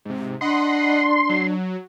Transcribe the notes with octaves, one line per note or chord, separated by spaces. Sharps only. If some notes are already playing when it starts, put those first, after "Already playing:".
G#2 C3
D4 D#5 F#5 B5 C6
F#3